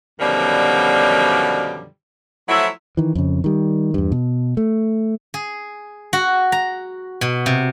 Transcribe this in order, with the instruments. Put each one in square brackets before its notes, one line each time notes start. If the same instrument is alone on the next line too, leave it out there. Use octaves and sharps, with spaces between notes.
[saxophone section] F#2 B2 D3 D#3 F3 G3
F3 F#3 A3 E4
[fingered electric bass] D#3 E3
F2 C#3
D#3 G3
E2 G2
B2
A3
[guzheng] G#4
F#4
A#5
B2
C3